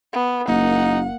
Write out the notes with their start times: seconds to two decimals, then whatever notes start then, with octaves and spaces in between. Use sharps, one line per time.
0.13 B3
0.48 F#1 A#3 D#4 F#5